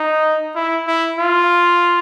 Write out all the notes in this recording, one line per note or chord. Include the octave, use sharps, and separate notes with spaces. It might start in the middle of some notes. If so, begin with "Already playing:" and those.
Already playing: D#4
E4
E4
F4